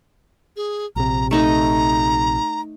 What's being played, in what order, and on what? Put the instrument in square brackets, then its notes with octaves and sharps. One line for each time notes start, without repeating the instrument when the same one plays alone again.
[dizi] G#4
[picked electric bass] A#1 C3 [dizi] A#5
[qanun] A3 D#4 D#5 [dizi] A#5